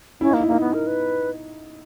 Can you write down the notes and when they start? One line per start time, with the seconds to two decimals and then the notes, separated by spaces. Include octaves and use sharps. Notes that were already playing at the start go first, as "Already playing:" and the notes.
0.21 C#4 E4
0.31 D#4
0.34 A#3
0.41 E4
0.47 A#3 D#4
0.60 B3
0.74 A#4
0.87 B4